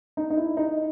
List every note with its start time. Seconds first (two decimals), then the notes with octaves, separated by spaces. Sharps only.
0.17 D#4
0.30 D#4
0.37 E4
0.57 D#4